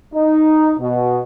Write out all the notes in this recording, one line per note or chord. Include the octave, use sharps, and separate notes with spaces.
D#4
B2